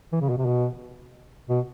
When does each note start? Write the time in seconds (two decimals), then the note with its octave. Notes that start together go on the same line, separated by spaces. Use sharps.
0.12 E3
0.21 C#3
0.29 B2
0.37 C3
0.46 B2
1.49 B2